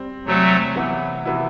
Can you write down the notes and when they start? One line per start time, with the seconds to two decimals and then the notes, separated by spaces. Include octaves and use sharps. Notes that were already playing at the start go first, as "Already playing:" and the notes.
Already playing: G3 C4
0.26 E2 C3 F#3 G3 A3 C4
0.76 C3 E3 B3 E4
1.25 C3 E3 B3 E4